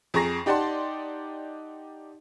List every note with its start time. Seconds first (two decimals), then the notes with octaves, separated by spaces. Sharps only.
0.14 F2 G#4 A#5 C#6 A#6 C7
0.46 D#4 G4 D5 F#5 A5 C6